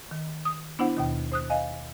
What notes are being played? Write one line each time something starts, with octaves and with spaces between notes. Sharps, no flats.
D#3
D#6
B3 D4 E4 C5 F#5
D#2 B2 D#3
C5 D#6 F#6
D#5 F5 G#5